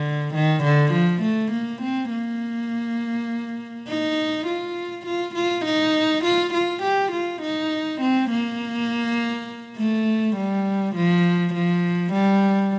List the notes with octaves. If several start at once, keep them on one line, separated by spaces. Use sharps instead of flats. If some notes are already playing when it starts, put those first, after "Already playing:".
Already playing: D3
D#3
D3
F3
A3
A#3
C4
A#3
D#4
F4
F4
F4
D#4
F4
F4
G4
F4
D#4
C4
A#3
A3
G3
F3
F3
G3